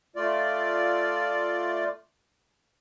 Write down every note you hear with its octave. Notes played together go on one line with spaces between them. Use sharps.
A3 F4 D5